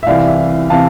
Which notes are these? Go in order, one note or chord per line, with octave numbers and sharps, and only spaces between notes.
E5
C2 C3 E3 D5 F5
E5
C3 E3 F5 A5